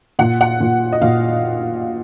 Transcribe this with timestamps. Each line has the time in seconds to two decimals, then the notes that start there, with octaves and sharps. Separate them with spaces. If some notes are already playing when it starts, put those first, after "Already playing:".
0.19 A#2 F#5
0.41 F#5
0.60 A#2
0.92 D#5
1.02 A#2 F5